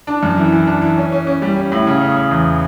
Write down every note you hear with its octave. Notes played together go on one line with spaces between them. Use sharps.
D4
F#2
E3
E3
D4
E3
C#4
C#4
C#4
G3
C#4
A2
C#3
C#3
C#3
E2